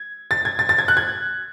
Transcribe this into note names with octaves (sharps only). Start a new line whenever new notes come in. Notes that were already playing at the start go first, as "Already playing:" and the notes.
Already playing: G#6
A6
G#6
A6
A6
G#6
F#6
G#6